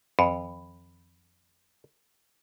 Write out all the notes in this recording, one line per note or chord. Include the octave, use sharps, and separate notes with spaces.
F2 B5